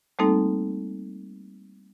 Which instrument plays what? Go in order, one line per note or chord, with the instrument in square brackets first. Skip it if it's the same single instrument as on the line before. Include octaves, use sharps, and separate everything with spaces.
[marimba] G3 A3 A#3 C4 D#4 A4